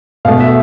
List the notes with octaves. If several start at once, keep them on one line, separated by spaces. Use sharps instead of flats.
B2 A3 F5
E5